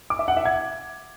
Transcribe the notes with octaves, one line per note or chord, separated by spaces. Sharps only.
D6
E5
F#5
E5
G#6